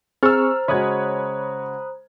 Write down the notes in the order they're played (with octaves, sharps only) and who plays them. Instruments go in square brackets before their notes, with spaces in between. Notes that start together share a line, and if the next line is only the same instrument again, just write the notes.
[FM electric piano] C4 G#4 C#6 [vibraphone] C5 A#5 [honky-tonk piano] E6 F6 [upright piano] A6
[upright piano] C#3 G#3 F#4 [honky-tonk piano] C#5 G#6 [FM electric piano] B5 D#6 F#6